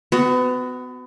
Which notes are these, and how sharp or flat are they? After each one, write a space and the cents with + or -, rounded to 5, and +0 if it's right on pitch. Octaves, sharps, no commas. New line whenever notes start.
B3 +30 F#4 +0